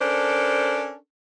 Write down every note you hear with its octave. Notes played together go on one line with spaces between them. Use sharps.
C#4 D4 A4 A#4 C5